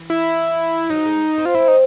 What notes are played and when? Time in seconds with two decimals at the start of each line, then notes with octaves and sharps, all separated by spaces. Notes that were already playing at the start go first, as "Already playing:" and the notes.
Already playing: E3
0.10 E4
0.90 F#3 D#4
1.05 G#3
1.38 C4
1.45 F4
1.54 C4 E4
1.68 D#4